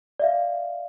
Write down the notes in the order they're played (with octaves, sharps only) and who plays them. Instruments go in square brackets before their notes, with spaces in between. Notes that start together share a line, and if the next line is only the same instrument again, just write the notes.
[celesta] D5 E5 F5